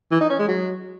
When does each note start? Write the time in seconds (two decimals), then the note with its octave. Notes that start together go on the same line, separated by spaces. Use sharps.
0.11 E3
0.21 D#4
0.30 C#4
0.39 G#3
0.48 F#3